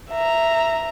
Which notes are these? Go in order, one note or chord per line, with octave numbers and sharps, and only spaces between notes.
E5 A#5